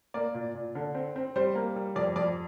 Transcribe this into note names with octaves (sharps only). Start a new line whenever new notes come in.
A#3 D5
A#2
A#2
D3
C4
C4
G3 C5
A#3
G3
F2 D5
F2 D5